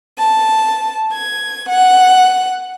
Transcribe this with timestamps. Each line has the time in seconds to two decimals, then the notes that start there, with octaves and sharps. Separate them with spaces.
0.18 A5
1.13 G#6
1.69 F#5